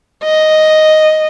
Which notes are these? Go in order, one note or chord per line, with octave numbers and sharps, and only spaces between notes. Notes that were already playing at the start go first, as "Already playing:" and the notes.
D#5